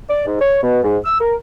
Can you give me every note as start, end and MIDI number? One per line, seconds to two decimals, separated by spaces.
0.09 0.24 74
0.26 0.40 44
0.40 0.58 73
0.62 0.80 47
0.83 0.97 44
1.04 1.18 88
1.20 1.34 70